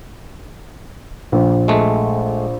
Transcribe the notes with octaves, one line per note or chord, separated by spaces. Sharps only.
A#1
G#3 A3